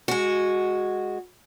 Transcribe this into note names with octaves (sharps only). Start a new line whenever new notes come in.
G#3 F#4